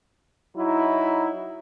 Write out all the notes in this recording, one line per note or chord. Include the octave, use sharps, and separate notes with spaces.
F#3 D#4 E4